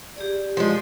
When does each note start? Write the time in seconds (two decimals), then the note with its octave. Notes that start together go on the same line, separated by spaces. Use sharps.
0.16 G4 G#4 D5
0.57 F3 G#3